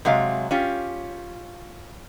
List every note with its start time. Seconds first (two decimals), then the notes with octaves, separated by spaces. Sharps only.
0.05 C3 F#3 G#3 F5
0.51 C#4 F4 G4